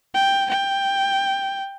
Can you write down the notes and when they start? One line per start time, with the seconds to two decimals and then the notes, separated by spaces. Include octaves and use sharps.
0.14 G5
0.49 G5